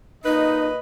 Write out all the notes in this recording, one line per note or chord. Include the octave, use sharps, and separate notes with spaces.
A#2 D#4 B4 D#5